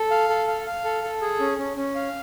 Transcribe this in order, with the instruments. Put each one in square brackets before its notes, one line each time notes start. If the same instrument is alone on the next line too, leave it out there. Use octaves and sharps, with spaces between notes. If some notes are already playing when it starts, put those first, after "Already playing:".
Already playing: [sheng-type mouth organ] A4
F5
A4
F5
F5
A4
A4
G#4
C#4
C#4
C#4
F5